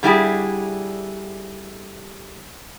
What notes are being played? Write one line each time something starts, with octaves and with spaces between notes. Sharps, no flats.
D3 G3 E4 G4 G#4